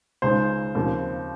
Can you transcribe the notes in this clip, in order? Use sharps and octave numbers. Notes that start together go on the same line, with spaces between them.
C#2 C#3 G#3 D#4 C5
D#2 C#3 F3 C4